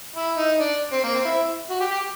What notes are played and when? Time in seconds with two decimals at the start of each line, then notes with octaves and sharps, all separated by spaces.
0.16 E4
0.37 D#4
0.60 D4
0.92 C4
1.03 A#3
1.15 C4
1.25 E4
1.70 F#4
1.80 G4
1.91 G4